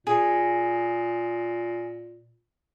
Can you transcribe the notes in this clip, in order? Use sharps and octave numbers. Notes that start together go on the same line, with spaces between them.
A#2 G#4